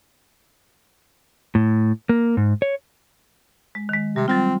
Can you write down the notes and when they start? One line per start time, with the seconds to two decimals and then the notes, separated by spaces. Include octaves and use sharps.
1.55 A2
2.09 A#3
2.37 G#2
2.62 C#5
3.75 G#3
3.89 D#3 G#3
4.16 C3 G3
4.28 F#3 G3 C4 F4